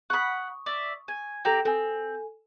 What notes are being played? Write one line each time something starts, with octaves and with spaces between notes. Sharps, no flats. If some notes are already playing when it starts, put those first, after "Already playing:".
F#5 B5 C#6 D#6
D5 E5
G#5
C4 G4 A4 G5 A#5
C4 A4 G#5